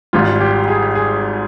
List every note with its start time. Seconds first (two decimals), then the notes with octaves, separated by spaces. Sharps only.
0.13 G#1 G#2 G3 F4
0.40 G4
0.68 G#4
0.95 G#4